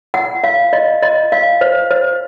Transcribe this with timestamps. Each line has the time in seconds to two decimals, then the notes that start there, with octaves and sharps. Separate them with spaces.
0.14 F#5
0.44 F5
0.73 D#5
1.02 D#5
1.32 F5
1.61 C5
1.91 C5